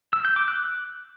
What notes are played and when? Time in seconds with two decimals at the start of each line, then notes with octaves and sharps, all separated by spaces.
0.13 E6
0.25 G6
0.36 D6
0.48 F#6